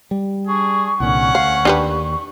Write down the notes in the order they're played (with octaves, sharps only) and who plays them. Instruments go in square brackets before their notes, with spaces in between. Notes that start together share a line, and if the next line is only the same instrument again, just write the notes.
[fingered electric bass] G3
[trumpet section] D4 G#4 [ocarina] C#6
[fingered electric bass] C2 A#2 D3 [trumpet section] C#4 F#5
[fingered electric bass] D2 [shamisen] F5
[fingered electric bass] D#2 [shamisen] D4 G4 B4